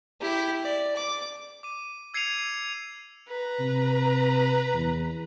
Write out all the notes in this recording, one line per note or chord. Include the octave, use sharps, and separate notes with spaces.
E4 G4
D5
D6
D6 D#7
E6 G#6 C7 C#7 D#7 F7
B4 A#5
C3
E2